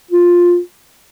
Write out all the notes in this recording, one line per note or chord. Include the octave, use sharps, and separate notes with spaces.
F4